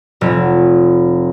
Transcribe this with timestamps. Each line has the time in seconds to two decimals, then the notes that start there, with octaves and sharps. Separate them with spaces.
0.21 F1